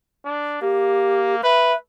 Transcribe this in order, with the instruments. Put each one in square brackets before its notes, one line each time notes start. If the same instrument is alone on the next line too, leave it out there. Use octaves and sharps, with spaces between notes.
[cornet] D4
[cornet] A#3 [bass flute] G4
[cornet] B4 [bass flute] E5